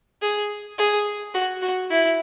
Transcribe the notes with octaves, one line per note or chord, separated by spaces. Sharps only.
G#4
G#4
F#4
F#4
E4